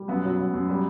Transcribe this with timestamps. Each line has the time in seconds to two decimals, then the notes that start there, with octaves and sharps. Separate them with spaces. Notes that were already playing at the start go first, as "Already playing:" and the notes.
Already playing: G3
0.08 F#2 B3
0.24 F#3
0.38 F#3
0.54 F#2
0.69 G3